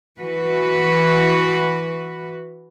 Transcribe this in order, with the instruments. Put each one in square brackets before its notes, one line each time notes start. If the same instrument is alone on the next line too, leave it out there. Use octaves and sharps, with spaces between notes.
[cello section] E3 F#4 B4